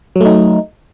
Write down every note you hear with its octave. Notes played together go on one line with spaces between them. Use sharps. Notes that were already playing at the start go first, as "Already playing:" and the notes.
F#3 A3 D#4